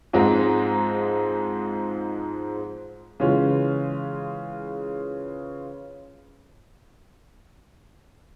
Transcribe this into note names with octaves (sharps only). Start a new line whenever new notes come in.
G#2 F3 G#3 C4 D#4
C#3 E3 G#3 C#4 F4